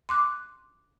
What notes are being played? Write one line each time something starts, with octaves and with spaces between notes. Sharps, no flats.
C6 D6 F#6